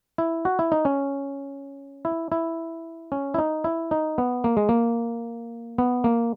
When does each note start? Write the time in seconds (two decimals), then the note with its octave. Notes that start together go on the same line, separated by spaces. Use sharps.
0.18 E4
0.45 F#4
0.59 E4
0.72 D#4
0.85 C#4
2.05 E4
2.32 E4
3.12 C#4
3.34 E4
3.38 D#4
3.64 E4
3.91 D#4
4.18 B3
4.44 A#3
4.57 G#3
4.69 A#3
5.78 B3
6.04 A#3